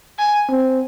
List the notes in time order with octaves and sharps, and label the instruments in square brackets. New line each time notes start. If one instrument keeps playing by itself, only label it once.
[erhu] G#5
[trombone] C4